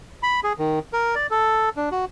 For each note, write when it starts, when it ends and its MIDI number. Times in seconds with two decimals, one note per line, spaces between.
0.23 0.40 83
0.44 0.53 68
0.59 0.79 51
0.93 1.15 70
1.15 1.27 74
1.31 1.69 69
1.77 1.89 62
1.92 2.05 66